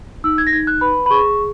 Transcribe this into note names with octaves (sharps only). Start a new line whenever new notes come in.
D#4 E6
G#6
A#6
D#4 G#6
F#6
B4 B5
B5
G#4 C#6